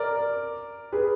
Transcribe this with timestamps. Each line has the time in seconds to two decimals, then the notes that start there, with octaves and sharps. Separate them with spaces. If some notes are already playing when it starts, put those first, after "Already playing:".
Already playing: A#4 D5
0.92 G#4 B4